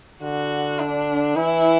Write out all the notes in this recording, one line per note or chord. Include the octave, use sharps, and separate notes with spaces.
D3 F#4
D4
E3 E4